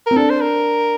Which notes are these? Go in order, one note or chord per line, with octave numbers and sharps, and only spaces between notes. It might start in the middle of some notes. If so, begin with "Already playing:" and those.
C4 A#4
D4 A4
C5
A#4